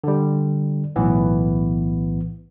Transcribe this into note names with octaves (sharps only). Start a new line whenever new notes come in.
D3 G3
B1 A2 E3 B3